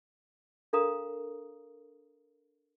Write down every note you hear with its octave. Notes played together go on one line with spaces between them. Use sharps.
D4 A4 A#4 F5 A#5 D#6